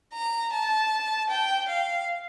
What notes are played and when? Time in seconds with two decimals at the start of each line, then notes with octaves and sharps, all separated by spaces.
0.14 A#5
0.53 A5
1.30 G5
1.69 F5